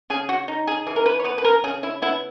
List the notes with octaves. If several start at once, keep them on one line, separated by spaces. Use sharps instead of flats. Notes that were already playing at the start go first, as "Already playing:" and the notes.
C#3 G#4
F#4
D#4
G#4
E3 G#4
A#4
B4
C#5
B3 B4
B4
A#4
C#3 G#4
E4
B3 E4